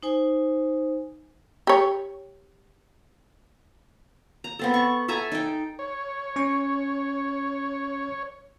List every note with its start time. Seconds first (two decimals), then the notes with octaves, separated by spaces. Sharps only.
0.03 D#4 C5 G#5
1.67 G4 C#5
4.44 A#5
4.59 B3 C4 A4
4.74 C#6
5.08 A4 E5 G#5 A#5
5.32 D#4 G5
5.79 C#5
6.36 C#4 C#6